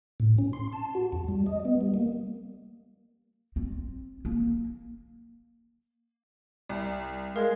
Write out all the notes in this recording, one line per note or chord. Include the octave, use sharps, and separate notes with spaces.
A2
C#4
C6
A5
F#4
F2
G3
D#5
B3
G3
A#3
C4
A#3
C2
G#3 A#4 F5